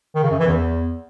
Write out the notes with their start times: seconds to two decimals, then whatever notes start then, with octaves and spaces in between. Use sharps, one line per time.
0.15 D#3
0.23 C#3
0.31 F#2
0.39 E3
0.47 E2